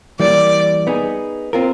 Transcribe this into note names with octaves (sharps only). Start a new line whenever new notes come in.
E3 G3 A#3 D5
B3 D#4 G#4
C4 F4 A#4